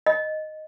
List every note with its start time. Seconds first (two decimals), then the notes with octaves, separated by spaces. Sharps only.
0.06 D#5